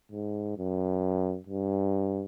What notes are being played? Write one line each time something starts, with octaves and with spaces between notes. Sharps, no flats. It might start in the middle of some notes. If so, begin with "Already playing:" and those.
G#2
F#2
G2